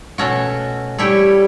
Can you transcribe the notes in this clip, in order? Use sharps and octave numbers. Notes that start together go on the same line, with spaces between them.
B2 A3 C#4 F#4
G3 A3 E4 G4 C#5